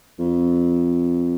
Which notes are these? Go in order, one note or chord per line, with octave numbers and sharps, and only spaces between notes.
F2